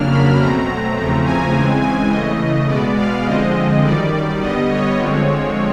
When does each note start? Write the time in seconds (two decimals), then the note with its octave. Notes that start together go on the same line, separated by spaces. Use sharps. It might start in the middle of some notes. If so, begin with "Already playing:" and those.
Already playing: F2 C#3 F#3 A#3 D4 F6
0.10 B5
0.38 B2 F#3 A3 C4 A#5
0.96 E2 C#3 F3 A3 C4
1.24 G#5
1.54 C#3 E3 G#3 C4
1.82 G#5
2.10 C#3 E3 A3 D#5
2.68 B2 G#3 B3 D5
2.97 F5
3.26 D3 F3 G#3 C4 D#5
3.83 F#2 D#3 G3 D5
4.41 D3 G3 B3 D#5
4.70 C#5
4.98 D3 F3 G#3 C4